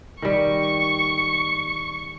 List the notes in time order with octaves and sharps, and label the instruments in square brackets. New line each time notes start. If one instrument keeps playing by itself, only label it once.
[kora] D#3 G3 [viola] C#6